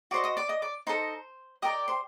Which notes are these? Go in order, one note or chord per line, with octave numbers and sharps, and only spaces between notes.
F#4 C5 D5 D#5 D6
D#5 D#6
D5 D6
D#5 D#6
D5 D6
D#4 A4 C5 D#5 C6
G4 A#4 D5 D#5 D#6
C5 C6